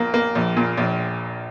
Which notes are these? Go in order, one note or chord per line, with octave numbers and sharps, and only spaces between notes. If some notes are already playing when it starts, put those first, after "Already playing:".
Already playing: A#1 A#2 A#3
A#3
A#1
A#2
A#1